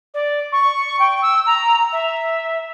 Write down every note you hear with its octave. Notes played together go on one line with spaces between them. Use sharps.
D5
C#6
G5
E6
A#5
E5